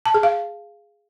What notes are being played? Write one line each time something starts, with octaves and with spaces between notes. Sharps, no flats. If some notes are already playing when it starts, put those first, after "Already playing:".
A5
G#4
F5